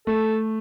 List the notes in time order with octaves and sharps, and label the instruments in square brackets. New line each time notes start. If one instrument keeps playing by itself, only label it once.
[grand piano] A3 [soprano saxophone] A4